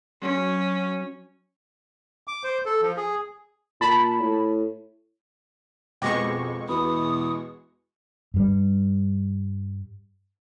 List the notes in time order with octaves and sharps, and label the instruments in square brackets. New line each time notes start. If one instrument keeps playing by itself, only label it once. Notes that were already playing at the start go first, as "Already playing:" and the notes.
[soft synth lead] F#3 [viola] C#4
[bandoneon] D6
C5
A4
F3
G#4
[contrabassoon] A#2 [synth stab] A5 B5
[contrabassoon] A2
[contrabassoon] F2 [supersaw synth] B2 G#3 C#6 [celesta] G5 D6 A#6
[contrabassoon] E2 [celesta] F#4 B4 B5 [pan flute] D#6
[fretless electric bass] G2 G3